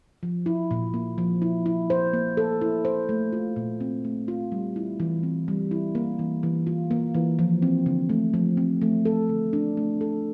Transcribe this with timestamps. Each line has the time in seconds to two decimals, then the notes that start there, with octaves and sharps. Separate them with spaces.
0.23 F3
0.46 E4
0.71 A#2
0.94 A#3
1.18 F3
1.42 E4
1.66 E4
1.90 C5
2.13 A#3
2.37 A4
2.61 E4
2.85 C5
3.09 A3
3.33 F4
3.56 A#2
3.80 C4
4.05 A3
4.28 F4
4.52 G3
4.76 E4
5.00 E3
5.23 C4
5.48 G3
5.71 E4
5.95 A#3
6.19 E3
6.43 E3
6.67 F4
6.91 A#3
7.15 E3
7.39 F3
7.62 C4
7.86 D3
8.10 A3
8.34 F3
8.57 C4
8.82 A3
9.05 A4
9.29 D3
9.53 D4
9.77 A3
10.01 A4